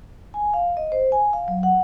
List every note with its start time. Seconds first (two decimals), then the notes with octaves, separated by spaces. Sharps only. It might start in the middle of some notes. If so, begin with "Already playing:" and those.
0.34 G#5
0.54 F5
0.77 D#5
0.92 C5
1.12 G#5
1.33 F5
1.48 F#3
1.63 F#5